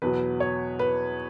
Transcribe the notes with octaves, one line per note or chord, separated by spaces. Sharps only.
E2 B2 F#3 B4
C#5
B4